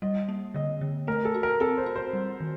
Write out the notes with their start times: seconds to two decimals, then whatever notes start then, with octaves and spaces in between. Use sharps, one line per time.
0.02 G3 D#5
0.29 A#3
0.54 D3 D#5
0.81 D3
1.07 A3 A#4
1.25 A4
1.34 F#4
1.43 A#4
1.60 C4 A4
1.78 C5
1.86 F#4
1.96 C5
2.13 G3
2.40 D#3